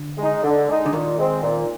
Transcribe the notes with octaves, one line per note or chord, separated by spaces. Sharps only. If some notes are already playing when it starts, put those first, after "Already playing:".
Already playing: D3
G#3 D#4
D3
G#3 D#4
D3
A#2 D#3
G#3 C4
A#2